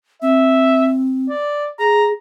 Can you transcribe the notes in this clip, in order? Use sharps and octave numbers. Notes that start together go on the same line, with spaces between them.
C4 E5
D5
G#4 A#5